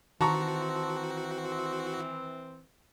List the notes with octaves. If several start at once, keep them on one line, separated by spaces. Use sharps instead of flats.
D#3 E3 C4 F#4 A5 A#5 C#6